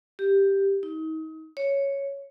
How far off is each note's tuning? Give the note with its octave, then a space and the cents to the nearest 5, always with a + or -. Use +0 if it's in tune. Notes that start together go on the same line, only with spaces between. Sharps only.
G4 +5
D#4 +35
C#5 +0